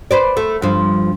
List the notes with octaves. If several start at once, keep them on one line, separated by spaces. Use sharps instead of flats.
B4 C5 D5
A3
G2 F3